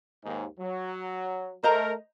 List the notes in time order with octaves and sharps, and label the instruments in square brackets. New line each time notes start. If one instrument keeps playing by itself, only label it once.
[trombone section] D#2 G#2
F#3
[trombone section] A3 A#4 [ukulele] C5 D#5 A#5